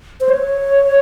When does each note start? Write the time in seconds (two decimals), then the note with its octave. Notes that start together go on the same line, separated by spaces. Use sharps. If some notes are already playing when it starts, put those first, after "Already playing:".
0.21 C5
0.29 C#5